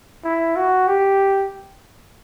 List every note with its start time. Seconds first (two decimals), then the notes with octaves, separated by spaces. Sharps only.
0.24 E4
0.56 F#4
0.88 G4